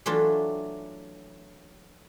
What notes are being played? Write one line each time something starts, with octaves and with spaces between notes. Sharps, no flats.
E3 F#3 A3 D4 F4